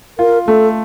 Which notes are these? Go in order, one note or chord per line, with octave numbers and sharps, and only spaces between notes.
F4 A#4
A3 A4